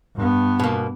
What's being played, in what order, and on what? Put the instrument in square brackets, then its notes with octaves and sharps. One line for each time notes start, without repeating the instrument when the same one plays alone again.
[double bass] G2 B3
[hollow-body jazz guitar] B2 A#3